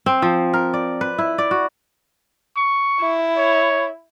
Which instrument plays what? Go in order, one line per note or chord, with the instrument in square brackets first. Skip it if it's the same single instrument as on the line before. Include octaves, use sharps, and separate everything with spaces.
[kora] C4
F3
A#4
D5
B4
E4
D5
F#4
[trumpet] C#6
[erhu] E4
[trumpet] C#5